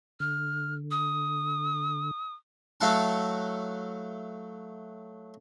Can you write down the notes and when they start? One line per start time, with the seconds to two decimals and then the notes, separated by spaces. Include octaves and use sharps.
0.20 D3 F6
0.91 D#6
2.81 F#3 A3 E4 F5 F#5 A5